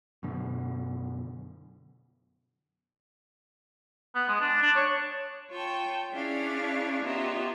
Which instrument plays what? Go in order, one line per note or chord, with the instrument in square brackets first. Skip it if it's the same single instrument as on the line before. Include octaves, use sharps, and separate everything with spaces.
[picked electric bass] F#2 B2 D3
[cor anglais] B3
G#3
D4
D4
C#5
[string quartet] F4 C#5 G5 A5
C#4 D4 E4 G#4 C#5 F5
B3 D#4 F4 G4 C#5 E5